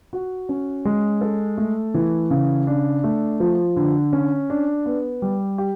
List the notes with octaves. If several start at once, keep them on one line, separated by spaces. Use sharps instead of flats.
F#4
C#4
G#3
A4
A3
E3
C#3
D4
A3
F3
D3
C#4
D4
B3
G3
G4